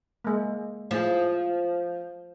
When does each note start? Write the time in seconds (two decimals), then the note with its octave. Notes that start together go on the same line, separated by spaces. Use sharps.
0.24 G#3 A#3
0.91 F3 A3 E4 G#4